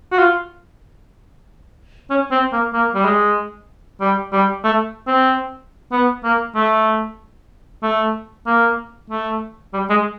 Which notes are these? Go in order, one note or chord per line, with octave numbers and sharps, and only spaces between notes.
F#4
F4
C#4
C4
A#3
A#3
G3
G#3
G3
G3
A3
C4
B3
A#3
A3
A3
A#3
A3
G3
G#3